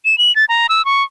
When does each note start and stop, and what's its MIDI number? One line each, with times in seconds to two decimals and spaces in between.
0.05 0.18 100
0.18 0.34 102
0.36 0.45 93
0.49 0.67 82
0.69 0.85 88
0.85 1.04 85